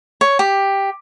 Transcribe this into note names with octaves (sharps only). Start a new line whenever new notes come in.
C#5
G4